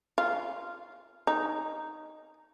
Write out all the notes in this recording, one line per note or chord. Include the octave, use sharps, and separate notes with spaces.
F4
D#4